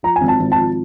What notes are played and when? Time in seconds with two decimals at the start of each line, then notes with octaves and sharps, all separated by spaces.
0.03 F3 A#5
0.16 G#5
0.21 G#1
0.28 A5
0.40 G#1
0.52 A5
0.58 F3